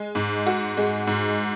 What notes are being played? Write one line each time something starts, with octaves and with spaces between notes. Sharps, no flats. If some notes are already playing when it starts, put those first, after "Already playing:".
Already playing: G#3
G#2
F#4
G#3
G#2